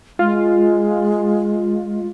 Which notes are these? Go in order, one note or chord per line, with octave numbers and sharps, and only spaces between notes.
G#3 F4